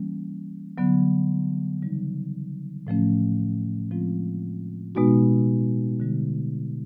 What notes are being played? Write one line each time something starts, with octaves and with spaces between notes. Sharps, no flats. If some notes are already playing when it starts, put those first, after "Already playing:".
Already playing: E3 G3 A#3 C#4
D3 F#3 B3
C#3 E3 G3 B3 D#4
A2 F3 A3 C#4
F3 G#3 C4 F4
B2 G#3 B3 D#4 F#4
D3 G3